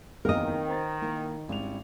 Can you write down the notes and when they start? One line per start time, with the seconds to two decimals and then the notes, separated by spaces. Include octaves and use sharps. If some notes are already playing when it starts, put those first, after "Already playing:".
0.25 F#1 E2 D#3 C4 A#4 D#5 F5 G5
0.68 C5 A#5 A6
1.02 A#3 D#4 E4
1.49 G#1 G3 C#4 E4 F7